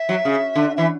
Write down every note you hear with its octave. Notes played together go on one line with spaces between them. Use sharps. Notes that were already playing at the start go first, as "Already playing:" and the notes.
Already playing: E5
F#3
C#3
D3
E3 E5